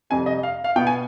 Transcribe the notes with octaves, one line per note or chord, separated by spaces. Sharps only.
F2 C3 G3 G#5
D#5
F5
F5
B2 B3 G5
G#5